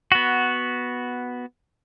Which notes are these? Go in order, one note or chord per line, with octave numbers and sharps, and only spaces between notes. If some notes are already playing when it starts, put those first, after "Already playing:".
B3 F#4